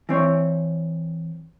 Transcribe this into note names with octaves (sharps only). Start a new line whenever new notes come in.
E3 C4 C#5